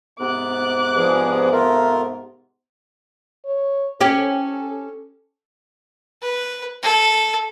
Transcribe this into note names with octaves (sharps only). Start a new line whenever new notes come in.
G#2 C3 B3 D6 F#6
G2 F3 G#4
A3 F4 A#4
C#5
C#4 G4 A4
B4
A4